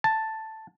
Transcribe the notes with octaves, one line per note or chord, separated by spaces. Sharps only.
A5